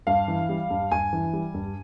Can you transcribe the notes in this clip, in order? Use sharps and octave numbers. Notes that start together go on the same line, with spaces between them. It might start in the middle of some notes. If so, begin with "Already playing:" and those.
G2 F5
E3
G3
G2
G2 G#5
E3
G3
G2